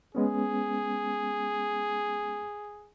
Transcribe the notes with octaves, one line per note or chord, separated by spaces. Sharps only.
G#3 B3 C#4 G#4